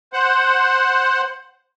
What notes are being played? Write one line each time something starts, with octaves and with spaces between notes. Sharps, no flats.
C5 F#5